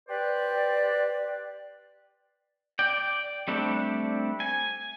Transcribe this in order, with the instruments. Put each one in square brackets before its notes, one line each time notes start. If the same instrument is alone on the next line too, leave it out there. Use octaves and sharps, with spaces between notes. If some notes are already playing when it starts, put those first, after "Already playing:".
[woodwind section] G4 B4 C5 D5
[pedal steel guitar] D5 G5
G3 A3 C4 D4
G#5